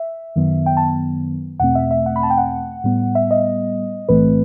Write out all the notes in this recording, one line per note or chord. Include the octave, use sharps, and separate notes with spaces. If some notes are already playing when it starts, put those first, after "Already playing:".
Already playing: E5
F#2 D#3 F#3 B3
G5
A5
E2 B2 A3 C4 F#5
E5
E5
F#5
B5
A5
G5
F#5
A2 G3 B3
E5
D#5
B1 A2 E3 A3 C4 B4